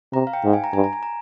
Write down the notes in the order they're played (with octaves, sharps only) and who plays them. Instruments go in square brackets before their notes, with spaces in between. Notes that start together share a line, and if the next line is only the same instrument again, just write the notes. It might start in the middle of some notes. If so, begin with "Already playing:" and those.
[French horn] C3 [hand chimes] A#5
[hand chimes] F5
G5
[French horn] G#2
[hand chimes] G#5
A#5
[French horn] G2 [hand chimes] G#5
[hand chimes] A#5
G#5
A#5